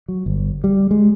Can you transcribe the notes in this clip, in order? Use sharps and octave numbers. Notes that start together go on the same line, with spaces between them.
F#3
G1
G3
G#3